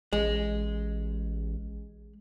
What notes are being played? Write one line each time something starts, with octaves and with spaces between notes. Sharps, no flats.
A1 G#3